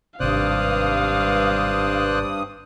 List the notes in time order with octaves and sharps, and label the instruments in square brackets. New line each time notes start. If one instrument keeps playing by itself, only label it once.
[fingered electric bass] G#1 C3 [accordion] G2 D#6 [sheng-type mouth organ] C5 D5 F#6 [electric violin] F5